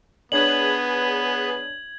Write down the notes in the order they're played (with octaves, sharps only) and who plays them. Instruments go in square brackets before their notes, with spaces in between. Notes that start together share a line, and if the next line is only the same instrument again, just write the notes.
[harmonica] B3 [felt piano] D4 C#5 [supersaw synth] G#4 B4 [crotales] G#6 F#7